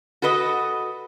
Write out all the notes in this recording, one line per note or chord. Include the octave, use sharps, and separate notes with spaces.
F#4 A4 B4 D#5